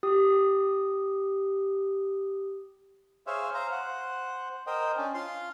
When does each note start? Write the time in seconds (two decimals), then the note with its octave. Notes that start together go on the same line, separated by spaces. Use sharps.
0.03 G4 D#6
3.27 G#4 C5 C#5 E5 F5
3.54 C5 F5 A#5
3.71 C5 F#5
4.67 A#4 C5 D#5 G5
4.97 C#4 D4
5.14 F4 F5 C6